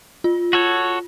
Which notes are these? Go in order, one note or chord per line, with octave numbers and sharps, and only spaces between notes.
F4
F#4 A4 C#5